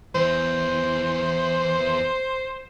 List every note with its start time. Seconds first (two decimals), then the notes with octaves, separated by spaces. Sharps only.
0.15 E2 E3 C5